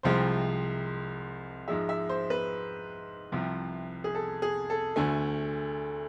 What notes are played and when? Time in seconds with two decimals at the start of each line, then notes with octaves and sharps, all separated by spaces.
0.03 C2 C3 F3 G#3 C5
1.68 G#2 F3 G#3 E5
1.89 E5
2.09 C5
2.30 B4
3.32 C2 C3 F3
4.04 G#4
4.15 A4
4.42 G#4
4.70 A4
4.96 D2 D3 A3 G#5